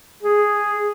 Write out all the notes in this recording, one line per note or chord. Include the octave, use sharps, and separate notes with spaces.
G#4